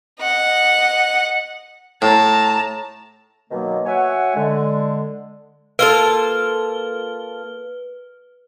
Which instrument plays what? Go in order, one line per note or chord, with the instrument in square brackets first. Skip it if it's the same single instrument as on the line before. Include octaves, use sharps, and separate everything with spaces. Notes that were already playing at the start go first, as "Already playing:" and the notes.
[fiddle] D#5 F#5
[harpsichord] A2 [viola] A5 A#5
[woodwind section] B2 D#3 F#3 A#3
F#4 C#5 E5 F#5 G#5
D3 G#3
[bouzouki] A#3 F4 A4 [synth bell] B4 F6 G7